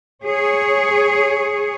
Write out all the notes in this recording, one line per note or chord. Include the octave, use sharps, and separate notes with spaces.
G#4 C#5